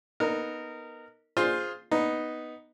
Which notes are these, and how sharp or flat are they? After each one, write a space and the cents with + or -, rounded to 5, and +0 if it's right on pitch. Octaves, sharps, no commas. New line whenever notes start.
B3 -20 D#4 +0 A#4 -25
F4 +10 G#4 +0 C5 +0
B3 +0 D#4 +0